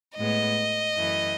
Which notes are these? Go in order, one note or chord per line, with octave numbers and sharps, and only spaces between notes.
A2 G#3 B3 D#5
F#2 E3 A3